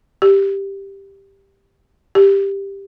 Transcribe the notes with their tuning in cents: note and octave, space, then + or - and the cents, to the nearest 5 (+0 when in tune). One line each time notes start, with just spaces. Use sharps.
G4 +5
G4 +10